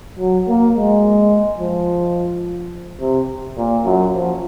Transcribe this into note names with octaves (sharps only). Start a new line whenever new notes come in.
F#3
A#3
G#3
F3
C3
A#2
F#2
F3